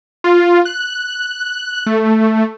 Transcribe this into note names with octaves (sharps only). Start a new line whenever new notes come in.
F4
F#6
A3